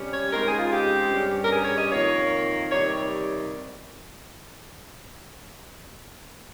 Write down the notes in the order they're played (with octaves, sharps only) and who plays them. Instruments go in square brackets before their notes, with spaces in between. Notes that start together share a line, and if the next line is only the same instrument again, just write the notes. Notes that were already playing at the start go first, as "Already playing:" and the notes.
Already playing: [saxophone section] C3 G3 C#4
C#5
C#3 G#3 C4 D#4 A#4
G#4
F4
G4
G2 G3 C#4
A#4
G#4
C#5
D#5
F2 D#3 A#3 C#5
C3 D#3 G3 C#5